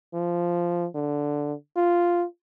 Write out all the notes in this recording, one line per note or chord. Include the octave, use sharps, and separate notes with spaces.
F3
D3
F4